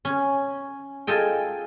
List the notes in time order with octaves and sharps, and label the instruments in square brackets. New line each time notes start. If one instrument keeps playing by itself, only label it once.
[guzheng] C#4
F4 G#4 A4 D#5 G5